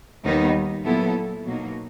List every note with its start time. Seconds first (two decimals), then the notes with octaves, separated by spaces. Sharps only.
0.24 D#2 D#3 G3 B3 D#4
0.84 A#2 F#3 B3 E4 A4
1.45 B2 F#3 A#3 D#4